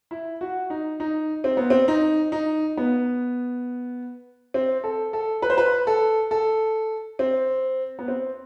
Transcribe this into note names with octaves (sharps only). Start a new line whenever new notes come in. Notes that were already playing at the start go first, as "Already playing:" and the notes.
E4
F#4
D#4
D#4
C4
B3
C4
D#4
D#4
B3
C4
A4
A4
B4
C5
B4
A4
A4
C4
B3
C4